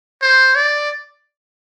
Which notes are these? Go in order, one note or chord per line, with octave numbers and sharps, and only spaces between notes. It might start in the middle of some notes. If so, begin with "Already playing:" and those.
C5
D5